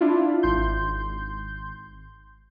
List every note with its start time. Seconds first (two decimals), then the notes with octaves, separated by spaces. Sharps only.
0.01 D4 E4 F4
0.43 G#1 C6 G6